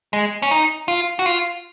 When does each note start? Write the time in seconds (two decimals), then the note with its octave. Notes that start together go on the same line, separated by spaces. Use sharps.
0.13 G#3
0.42 C#4
0.51 D#4
0.88 F4
1.19 F#4
1.26 F4